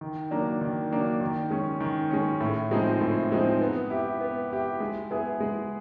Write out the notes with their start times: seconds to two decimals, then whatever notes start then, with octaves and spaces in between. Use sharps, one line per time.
0.01 D#3
0.31 F#3 A#3 D4
0.61 D#3
0.91 F#3 A#3 D4
1.21 D#3
1.51 G#3 C#4
1.80 D#3
2.10 G#3 C#4
2.41 A2
2.71 F3 G#3 C4 D#4
3.01 A2
3.31 F3 G#3 C4 D#4
3.61 B3
3.90 E4 G4
4.21 B3
4.50 E4 G4
4.80 G#3
5.11 B3 E4 G#4
5.40 G#3